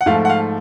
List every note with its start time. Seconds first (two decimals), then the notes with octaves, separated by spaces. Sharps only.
0.01 F#5
0.06 G#2 F3 A3 F5
0.25 F#5
0.30 F5